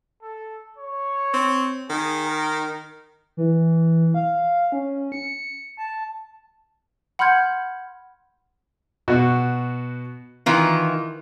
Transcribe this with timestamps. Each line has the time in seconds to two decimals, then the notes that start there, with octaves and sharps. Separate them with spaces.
0.22 A4
0.78 C#5
1.34 C4
1.90 D#3 G#4
2.26 A#4
3.37 E3
4.14 F5
4.72 C#4
5.12 C#7
5.77 A5
7.19 F#5 B5 C6 F6 G6 G#6
9.08 B2 F#4
10.46 D#3 E3 F4